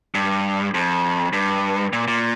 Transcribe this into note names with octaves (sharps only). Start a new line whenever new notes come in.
G2
F2
G2
A#2
A#2